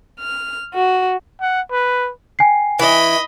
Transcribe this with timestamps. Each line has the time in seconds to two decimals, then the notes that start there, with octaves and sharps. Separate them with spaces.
0.19 F6
0.74 F#4
1.41 F#5
1.71 B4
2.39 G5 G#5 C7
2.79 E3 D#5 B5